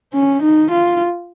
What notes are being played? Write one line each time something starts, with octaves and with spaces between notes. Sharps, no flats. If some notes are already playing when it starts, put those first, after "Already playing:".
C#4
D#4
F4